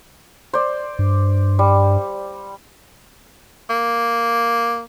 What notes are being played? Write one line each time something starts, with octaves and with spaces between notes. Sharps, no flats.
C5 D5
G2
G3
A#3